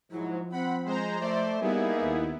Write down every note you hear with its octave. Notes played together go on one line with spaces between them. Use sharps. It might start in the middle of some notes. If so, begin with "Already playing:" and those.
G#2 F3 F#3 E4
C4 F#5 B5
G#3 C5 A#5
A3 C5 D5 E5
G3 A#3 B3 D#4 E4 G#4
D#2